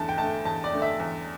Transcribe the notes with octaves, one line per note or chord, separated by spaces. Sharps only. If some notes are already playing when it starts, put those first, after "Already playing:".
Already playing: E2 D3 A3 A5
G5
D3 A3 A5
E2 A5
D5
D3 A3
E5
E2